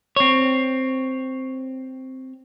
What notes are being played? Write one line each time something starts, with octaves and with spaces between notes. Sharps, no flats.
C4 C#5